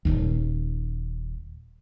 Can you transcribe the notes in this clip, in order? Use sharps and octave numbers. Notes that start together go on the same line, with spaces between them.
D#1 G#1 D#2